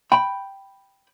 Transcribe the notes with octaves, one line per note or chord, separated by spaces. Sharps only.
G5 B5